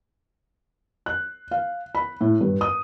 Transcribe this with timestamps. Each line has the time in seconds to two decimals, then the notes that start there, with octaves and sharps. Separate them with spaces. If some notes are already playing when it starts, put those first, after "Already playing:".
1.06 F#6
1.51 F5
1.95 B5
2.21 A2
2.41 G2
2.61 D#6